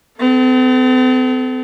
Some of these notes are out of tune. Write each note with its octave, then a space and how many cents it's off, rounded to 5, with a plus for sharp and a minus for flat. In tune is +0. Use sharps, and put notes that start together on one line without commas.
C4 -45 A4 -15